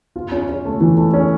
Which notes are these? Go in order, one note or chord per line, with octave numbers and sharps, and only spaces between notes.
F4
C#4
C#4
A3
E3
A3
C#4